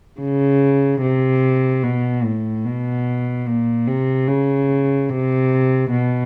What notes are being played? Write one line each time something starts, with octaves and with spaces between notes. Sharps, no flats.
C#3
C3
B2
A2
B2
A#2
C3
C#3
C3
B2